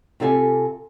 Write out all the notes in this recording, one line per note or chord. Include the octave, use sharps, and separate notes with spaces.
C3 F4 G4 A4 G5 G#5